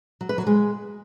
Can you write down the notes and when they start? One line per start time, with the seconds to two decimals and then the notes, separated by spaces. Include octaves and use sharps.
0.21 F#3
0.29 B4
0.38 F#3
0.47 G#3